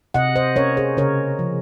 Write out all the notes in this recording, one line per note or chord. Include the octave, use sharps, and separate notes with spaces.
C3 D#5 F#5
C5 D#5
C#4 A#4 C#5
G#4 C5
C#3 A#4 C#5
F3